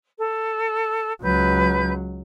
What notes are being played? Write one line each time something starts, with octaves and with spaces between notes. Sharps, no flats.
A4
C#2 F#3 B4 G6